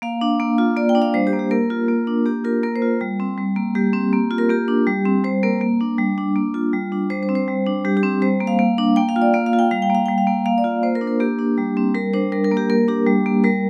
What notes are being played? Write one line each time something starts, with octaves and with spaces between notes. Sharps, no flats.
A#3 F5
D4
A#3
F4
A#3 D5
G5
D4
F5
G3 C5
G4
A#3
G4
A#3 A#4
F4
A#3
D4
A#3 G4
F4 A#4
A#3 A#4
C5
F4
G3
C4
G3
A#3
G3 G4
C4
A#3
F4
A#4
A#3 G4
D4
G3
C4
G3 C5
A#3 A#4
A#3
D4
G3
D4
A#3
F4
G3
D4
G3 C5
C5
C4
C5
G3
D4
G3 G4
G4
C4
G3 C5
A#3
F5
A#3
D4
A#3 G5
F5
F4
D5
A#3 F5
F5
F4
G5
G3 F5
G5
A#3 F5
G3 G5
F5
A#3
A#3 F5
D5
F4
A#3 C5
A#4
D4
A#4
A#3 G4
D4
G3
C4
G3 A#4
D4 C5
G3 A#4
A#4
A#3
G4
A#3 A#4
D4 G4
G3
A#3
G3 A#4